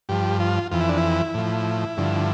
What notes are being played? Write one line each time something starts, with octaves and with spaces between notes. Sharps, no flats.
G2 F3 G4
F4
F2 E3 F4
E4
D4
E4
A2 F3
G2 D3 F3